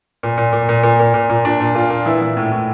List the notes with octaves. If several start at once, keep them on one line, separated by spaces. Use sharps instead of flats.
A#2
A#2
A#2
A#2
A#2
A#2
A#2
A#2
A#2 D4
A#2
A#2 F4
A#2
E3 E4
E3
A2
A2